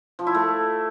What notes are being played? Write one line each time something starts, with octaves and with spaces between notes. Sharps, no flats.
F3
E4
A3